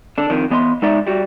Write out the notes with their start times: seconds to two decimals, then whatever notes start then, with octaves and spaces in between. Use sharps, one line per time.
0.18 D3 D4
0.30 F2 D#3
0.50 E3 B3 D#5 A5 C6
0.82 G#3 D#4 D5 E5
1.07 G3 F#4